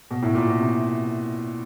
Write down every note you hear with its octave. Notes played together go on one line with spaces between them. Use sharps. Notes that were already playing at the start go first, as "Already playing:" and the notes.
B2
A2
A#2
B2
C3